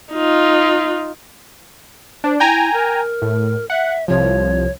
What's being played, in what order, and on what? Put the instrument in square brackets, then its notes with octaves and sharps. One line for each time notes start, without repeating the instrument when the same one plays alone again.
[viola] D#4 F4
[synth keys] D4 [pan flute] C5
[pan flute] E4 [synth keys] G5 G#5 A#5
[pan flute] A#4
[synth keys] A2
[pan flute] E5 [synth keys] F#5
[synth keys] C2 F3 [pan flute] C#5